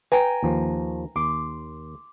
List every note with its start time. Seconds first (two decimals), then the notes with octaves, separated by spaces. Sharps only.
0.12 B4 G5 G#5 A#5
0.43 D#2 F3
1.16 D#2 C6 D6